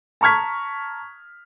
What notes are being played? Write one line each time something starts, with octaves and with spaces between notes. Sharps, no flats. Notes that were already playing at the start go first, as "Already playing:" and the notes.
A5 A#5 C#6 F6 G#6 B6